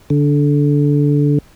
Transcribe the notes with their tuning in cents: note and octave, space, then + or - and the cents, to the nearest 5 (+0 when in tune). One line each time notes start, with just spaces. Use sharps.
D3 -15